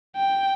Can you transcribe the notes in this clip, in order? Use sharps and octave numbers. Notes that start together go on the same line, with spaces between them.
G5